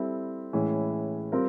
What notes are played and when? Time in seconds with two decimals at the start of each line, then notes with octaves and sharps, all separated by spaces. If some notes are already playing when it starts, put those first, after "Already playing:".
Already playing: G3 C4 E4 A4
0.53 A2 E3 G#3 C#4 E4
1.32 G3 C4 F4 A#4